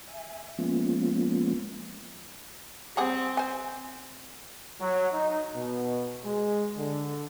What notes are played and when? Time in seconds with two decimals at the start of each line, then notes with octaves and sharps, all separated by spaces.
0.08 E5 G#5
0.58 F3 G#3 A#3 B3 C#4 F4
2.97 G3 C4 G#4 F#5
3.37 C5 G#5
4.81 F#3
5.13 D#4
5.56 B2
6.23 G#3
6.77 D3